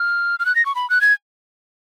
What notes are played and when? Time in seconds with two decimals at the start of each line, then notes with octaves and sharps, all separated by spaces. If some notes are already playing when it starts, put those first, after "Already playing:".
Already playing: F6
0.39 F6
0.46 F#6
0.56 A#6
0.66 C#6
0.75 B5
0.90 F#6
1.01 G#6